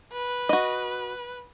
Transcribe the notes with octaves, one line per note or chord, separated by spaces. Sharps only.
B4
F#4 D#5